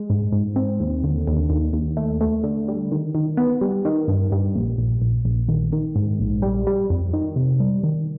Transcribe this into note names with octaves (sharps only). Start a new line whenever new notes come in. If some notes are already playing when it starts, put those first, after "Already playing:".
Already playing: G#3
G#2
G#2
C4
D#2
D3
D#2
D#2
D#2
A3
A3
D3
G3
D#3
D#3
B3
G3
D#3
G2
G2
A#1
A#1
A#1
A#1
D#3
D#3
G#2
A#1
G3
G3
F2
D#3
C3
G3
D#3